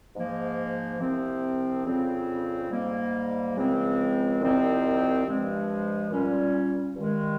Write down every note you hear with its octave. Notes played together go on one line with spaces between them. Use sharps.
G#2 F3 A#3
C2 C3 F3 C4
F2 C#3 G3 C4
G#2 G3 A#3
C#2 C#3 F3 G#3 C4
C2 A#2 F3 C4 D#4
G2 F3 G#3
A#2 G3 C#4
G2 D#3 G#3